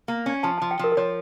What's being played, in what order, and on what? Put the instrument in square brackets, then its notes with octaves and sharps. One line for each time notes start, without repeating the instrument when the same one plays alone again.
[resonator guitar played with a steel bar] A#3
C#4
[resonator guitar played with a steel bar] F3 [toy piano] A5
[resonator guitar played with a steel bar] F3 [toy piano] A5
[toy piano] G5
[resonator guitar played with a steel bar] F3 [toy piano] A#4
[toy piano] A#4
[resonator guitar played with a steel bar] F3 [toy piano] C#5